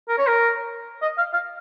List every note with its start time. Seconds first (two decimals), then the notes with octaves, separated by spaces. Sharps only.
0.09 A#4
0.18 C#5
0.27 A#4
1.02 D#5
1.18 F5
1.33 F5